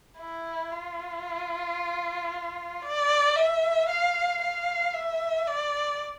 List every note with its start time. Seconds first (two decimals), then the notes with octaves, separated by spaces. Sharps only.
0.19 E4
0.72 F4
2.83 D5
3.36 E5
3.89 F5
4.42 F5
4.94 E5
5.48 D5